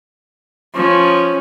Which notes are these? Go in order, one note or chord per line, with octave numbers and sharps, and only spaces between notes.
F3 C#4